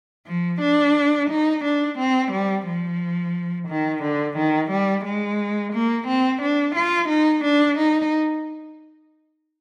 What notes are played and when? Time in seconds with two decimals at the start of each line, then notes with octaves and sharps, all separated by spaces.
0.27 F3
0.61 D4
1.30 D#4
1.64 D4
1.98 C4
2.32 G3
2.66 F3
3.68 D#3
4.02 D3
4.37 D#3
4.70 G3
5.05 G#3
5.72 A#3
6.07 C4
6.42 D4
6.75 F4
7.09 D#4
7.44 D4
7.78 D#4